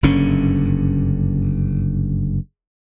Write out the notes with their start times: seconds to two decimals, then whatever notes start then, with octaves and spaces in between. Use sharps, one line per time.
0.03 F#1 G2 D3 C#4